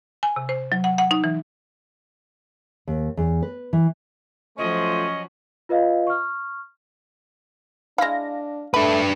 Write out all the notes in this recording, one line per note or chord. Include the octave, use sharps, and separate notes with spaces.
G#5
C3
C5
F#3
F#5
F#5
D#4
E3
D#2
E2
B4
E3
F3 F#3 A3 C#4 F4 C5 D#5
F4 B4 D#5 F5
C#6 F6
G#3 D4 E4 F5 A#6
A3 D4 B4 B5